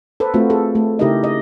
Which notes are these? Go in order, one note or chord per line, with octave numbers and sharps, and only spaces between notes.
A4 B4 C5
A3 C4 F4 F#4
G#4 A4
A3
C#3 D#4 E4 G4 A#4 D#5
D#5